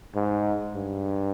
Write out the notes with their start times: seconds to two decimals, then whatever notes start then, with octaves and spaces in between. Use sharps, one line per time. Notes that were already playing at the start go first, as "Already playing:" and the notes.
0.15 G#2
0.75 G2